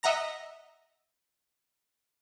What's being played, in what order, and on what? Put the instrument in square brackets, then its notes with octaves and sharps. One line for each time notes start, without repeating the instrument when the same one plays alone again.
[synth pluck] D#5 E5 F#5 A#5 A#6